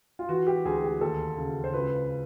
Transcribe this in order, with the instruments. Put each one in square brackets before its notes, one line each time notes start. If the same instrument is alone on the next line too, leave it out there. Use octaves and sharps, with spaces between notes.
[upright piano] F4
E3 F#4
G4
D2 G#4
G4
D#2 A4
C#3
C5
C#2 B4